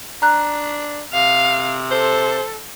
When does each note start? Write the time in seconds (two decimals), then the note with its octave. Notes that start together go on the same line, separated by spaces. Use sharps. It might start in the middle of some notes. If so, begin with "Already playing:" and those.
0.22 D4 A#5 F#6
1.13 C3 F5
1.91 A4 C5